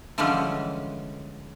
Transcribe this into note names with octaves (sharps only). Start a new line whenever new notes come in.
D3 E3 F3 G3 G#3 C#4